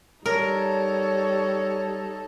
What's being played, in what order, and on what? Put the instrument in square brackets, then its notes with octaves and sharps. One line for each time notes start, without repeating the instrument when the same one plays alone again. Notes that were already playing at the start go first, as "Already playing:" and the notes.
[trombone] G3 [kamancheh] D#4 A4 [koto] A#4 [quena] C#5